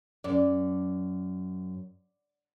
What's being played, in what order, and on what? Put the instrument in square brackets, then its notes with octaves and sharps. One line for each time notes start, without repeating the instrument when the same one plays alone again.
[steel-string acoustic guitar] F#2 [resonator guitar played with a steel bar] D5